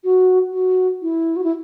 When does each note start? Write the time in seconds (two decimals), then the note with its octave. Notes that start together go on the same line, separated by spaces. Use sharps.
0.04 F#4
0.53 F#4
1.02 E4
1.36 F#4
1.44 E4